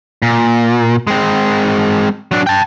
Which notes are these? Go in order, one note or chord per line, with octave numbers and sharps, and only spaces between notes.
A#2
G#3 C4
F#3 D4
G5 A5